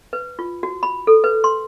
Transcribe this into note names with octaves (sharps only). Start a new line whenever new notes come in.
B4
F4
F#4
B5
A4
B4
C6